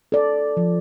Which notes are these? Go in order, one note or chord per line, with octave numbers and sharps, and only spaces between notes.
A4 D5
F3